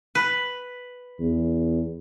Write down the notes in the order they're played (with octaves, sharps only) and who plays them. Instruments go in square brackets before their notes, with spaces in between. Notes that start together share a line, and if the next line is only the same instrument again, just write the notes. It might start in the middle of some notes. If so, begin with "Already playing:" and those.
[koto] B4
[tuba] E2